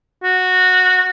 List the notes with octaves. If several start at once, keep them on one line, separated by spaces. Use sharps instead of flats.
F#4